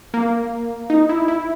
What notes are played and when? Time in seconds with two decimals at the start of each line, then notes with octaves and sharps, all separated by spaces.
0.14 A#3
0.90 D#4
1.09 E4
1.28 E4